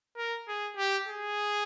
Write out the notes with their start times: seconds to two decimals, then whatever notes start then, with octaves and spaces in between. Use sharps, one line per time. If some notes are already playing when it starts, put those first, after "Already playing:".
0.17 A#4
0.48 G#4
0.77 G4
1.08 G#4